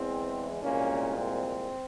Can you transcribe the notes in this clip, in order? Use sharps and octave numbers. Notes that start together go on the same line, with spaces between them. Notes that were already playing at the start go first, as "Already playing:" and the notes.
Already playing: E2 E3 G#3 C4
C2 A#2 G#3 A#3 C#4
C4